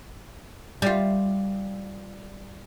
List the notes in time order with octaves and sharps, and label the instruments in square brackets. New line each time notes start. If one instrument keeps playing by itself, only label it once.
[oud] G3 F4